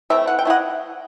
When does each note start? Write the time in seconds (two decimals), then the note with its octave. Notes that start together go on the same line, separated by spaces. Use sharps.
0.10 E3 A3 C4 E5 G5
0.27 E3 F#5
0.39 G5
0.45 A3 E4 D#5 F#5